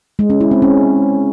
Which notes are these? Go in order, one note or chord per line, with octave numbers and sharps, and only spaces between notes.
G#3
C#4
E4
C4
C#4